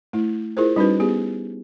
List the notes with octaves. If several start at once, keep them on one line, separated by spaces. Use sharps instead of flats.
A3 E4
E4 F4 G#4 A#4 C5
G3 C#4 D#4 E4 F#4 B4
B3 G4 G#4